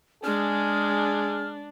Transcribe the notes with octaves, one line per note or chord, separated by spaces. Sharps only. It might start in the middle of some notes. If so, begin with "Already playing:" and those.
G#3 D4 G#4 F6